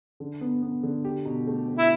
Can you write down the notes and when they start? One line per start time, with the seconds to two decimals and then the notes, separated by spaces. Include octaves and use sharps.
0.20 D3
0.41 B3
0.62 B3
0.83 D3
1.05 G4
1.25 B2
1.47 A3
1.68 A3
1.78 E4